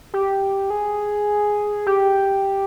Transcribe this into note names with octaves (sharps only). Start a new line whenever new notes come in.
G4
G#4
G4